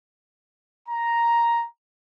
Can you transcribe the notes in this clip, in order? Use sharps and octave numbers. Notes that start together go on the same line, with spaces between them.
A#5